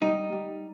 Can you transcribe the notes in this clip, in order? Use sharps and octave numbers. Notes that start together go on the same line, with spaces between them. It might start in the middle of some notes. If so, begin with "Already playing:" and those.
G3 D#4
G3